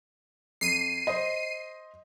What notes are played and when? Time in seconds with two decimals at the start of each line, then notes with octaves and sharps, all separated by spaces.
0.61 F2 C7 D#7
1.07 C5 D#5